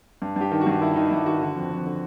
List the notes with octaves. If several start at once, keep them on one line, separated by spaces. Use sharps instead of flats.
G2
G2 G4
D#3
F#4
G2
D#3 E4
D#3 D#4
G2 E4
D#3 F#4
D3
F2
F2
D3